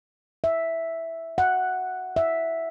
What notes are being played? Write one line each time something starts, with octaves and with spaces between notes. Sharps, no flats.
E5
F#5
E5